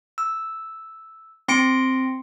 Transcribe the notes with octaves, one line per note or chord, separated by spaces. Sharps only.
E6
C4 C6 A#6 C#7 D7